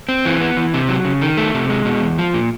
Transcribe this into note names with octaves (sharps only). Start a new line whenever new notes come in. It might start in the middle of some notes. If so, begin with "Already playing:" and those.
C4
E3
B3
E3
C3
F#3
C#3
D#3
A3
C3
G#3
B2
E2
F3
A#2